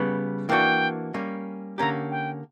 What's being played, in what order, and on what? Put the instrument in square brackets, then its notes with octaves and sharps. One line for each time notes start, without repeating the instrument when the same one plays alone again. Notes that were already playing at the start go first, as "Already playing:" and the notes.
Already playing: [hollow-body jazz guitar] C#3 G3 B3
[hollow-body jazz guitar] E3 A#3 D4 F#4 [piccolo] G5
[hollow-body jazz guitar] G3 A#3 C#4
[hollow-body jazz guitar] D3 A#3 C#4 G4 [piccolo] A#5
[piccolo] G5